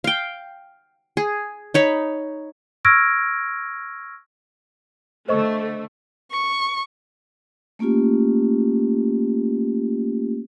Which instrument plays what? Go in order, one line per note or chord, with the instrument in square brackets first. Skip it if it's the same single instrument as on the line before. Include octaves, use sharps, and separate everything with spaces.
[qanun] F5 G5
G#4
D#4 C#5 B5
[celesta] C#6 E6 F6 G#6 A#6 D7
[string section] D3 A3 [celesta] C5 D#5 C#6
[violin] C#6
[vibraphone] A3 A#3 C#4 F4 G4